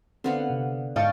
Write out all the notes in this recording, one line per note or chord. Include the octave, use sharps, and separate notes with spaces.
D3 B3 C4 F5
C3
G#2 D5 D#5 F5 G5 A5 C#6